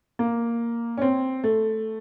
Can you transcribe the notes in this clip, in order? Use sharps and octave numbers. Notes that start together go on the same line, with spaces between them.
A#3
C#4
C4
A3